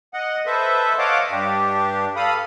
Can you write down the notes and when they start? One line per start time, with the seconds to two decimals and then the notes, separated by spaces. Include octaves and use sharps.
0.14 D#5 F#5
0.46 A4 B4 C5 E5
0.99 C#5 D#5 F5 F#5 A5 D6
1.31 G2 D4 G4
2.16 A4 F5 B5 D#6